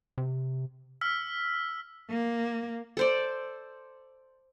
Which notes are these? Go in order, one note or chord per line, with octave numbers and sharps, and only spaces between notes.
C3
E6 F6 B6
A#3
A4 C5 D5